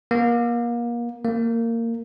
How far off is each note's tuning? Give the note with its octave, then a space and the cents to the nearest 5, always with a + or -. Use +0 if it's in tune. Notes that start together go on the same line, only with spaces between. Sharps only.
A#3 +30
A#3 -20